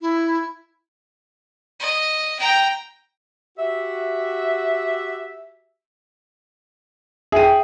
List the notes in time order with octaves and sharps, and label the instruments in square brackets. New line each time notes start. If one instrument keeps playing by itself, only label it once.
[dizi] E4
[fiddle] D#5
G5 A#5
[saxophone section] F#4 G4 E5
[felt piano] G#4 D#7 [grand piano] E5 G5